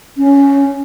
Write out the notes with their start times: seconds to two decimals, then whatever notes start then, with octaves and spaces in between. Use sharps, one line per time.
0.18 C#4